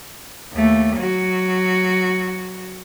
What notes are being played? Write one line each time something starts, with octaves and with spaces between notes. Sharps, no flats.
D#2 A3
F#3 F#4